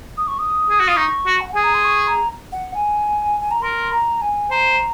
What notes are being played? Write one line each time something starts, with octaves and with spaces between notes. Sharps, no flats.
D#6
C#6
D#6
G#4
F#4
F4 D#6
D#4 C#6
F#4
F#5
G#4 G#5
A#5
C6
C#6
A#5
F#5
G#5
G#5
A#5
A#4 C6
A#5
G#5
C5 A#5